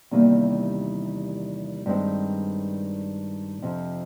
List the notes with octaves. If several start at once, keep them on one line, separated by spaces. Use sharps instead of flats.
E2 C3 D#3 G3 A#3
G2 D#3 G#3 C4
F2 C3 F3